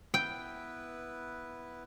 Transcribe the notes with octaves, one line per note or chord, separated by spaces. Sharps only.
B3 E4 B4 G5